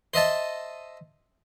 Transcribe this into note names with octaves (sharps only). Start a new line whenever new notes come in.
C5 D#5 E5 A5